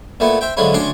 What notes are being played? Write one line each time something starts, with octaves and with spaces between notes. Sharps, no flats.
A#2 A3 B3 E4
C5 E5 G5
D3 F3 F#3 G#3 C#4 E4
D2 C#4 D4 D5 C6 C#6